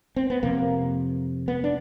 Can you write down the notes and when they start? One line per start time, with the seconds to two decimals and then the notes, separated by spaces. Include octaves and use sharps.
0.16 C4
0.30 B3
0.43 F2 C3 A#3
1.48 B3
1.64 D4